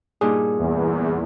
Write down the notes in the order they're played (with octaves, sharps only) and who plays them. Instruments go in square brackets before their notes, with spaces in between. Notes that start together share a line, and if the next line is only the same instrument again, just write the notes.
[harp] G2 A#2 D#4 [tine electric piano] G#4
[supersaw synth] E2